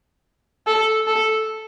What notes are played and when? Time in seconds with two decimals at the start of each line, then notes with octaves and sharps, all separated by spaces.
0.67 A4
1.07 A4